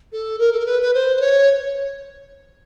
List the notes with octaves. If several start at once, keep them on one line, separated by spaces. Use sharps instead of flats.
A4
A#4
A4
A#4
B4
B4
C5
C5
C#5